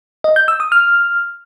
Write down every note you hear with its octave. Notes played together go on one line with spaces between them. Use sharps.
D#5
G6
E6
D#6
F6